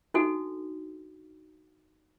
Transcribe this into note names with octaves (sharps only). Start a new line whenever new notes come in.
D4 D#4 F#4 A4